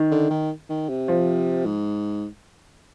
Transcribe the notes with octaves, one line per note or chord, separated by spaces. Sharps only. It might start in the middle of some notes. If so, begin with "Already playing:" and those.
Already playing: D#3
D3
D#3
D#3
C3
F3
G#2